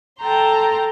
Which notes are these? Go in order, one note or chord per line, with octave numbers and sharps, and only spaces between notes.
A4 G5 A5 A#5 C6